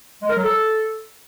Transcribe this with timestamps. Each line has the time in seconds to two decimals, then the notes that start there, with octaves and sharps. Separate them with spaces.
0.22 G#3
0.29 A#4
0.36 F#3
0.44 A4